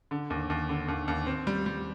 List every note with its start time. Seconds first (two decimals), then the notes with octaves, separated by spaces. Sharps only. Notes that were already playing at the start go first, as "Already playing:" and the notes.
0.11 D3
0.30 D#2
0.50 D#2
0.69 D3
0.88 D#2
1.08 D#2
1.27 C4
1.47 G3
1.66 G3